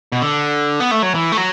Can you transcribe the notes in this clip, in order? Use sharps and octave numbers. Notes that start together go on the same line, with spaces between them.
B2
D3
B3
A3
F#3
E3
A3
F#3